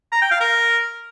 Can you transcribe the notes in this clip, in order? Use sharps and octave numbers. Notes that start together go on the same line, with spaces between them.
A#5
G5
F5
A#4